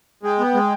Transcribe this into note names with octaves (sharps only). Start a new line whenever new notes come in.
G#3 G5
B3
G#3